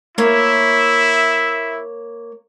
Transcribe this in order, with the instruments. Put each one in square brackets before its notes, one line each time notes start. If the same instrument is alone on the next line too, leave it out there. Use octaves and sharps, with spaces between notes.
[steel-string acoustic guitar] A#3 C#5 [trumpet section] E4 E5